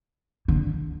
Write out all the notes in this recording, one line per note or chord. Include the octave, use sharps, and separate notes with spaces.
D3